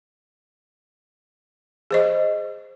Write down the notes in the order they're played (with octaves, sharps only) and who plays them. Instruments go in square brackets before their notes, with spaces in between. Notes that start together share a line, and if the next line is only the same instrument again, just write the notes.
[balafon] G#4 C5 D#5